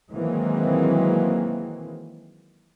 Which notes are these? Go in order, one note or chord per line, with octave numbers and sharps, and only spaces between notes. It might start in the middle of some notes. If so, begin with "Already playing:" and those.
D#3 E3 F#3 G#3 A#3 C4